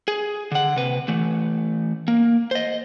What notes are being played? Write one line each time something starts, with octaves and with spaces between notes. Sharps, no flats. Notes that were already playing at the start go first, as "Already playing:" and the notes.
G#4
D3 F#5
C3 B4
E3 A3
A#3
C5 D#5